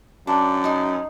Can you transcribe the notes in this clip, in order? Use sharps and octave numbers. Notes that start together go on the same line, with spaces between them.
F#2 D4
D#4 C6